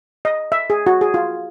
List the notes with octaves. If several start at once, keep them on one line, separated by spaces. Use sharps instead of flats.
D#5
E5
G#4
F#4
G#4
F4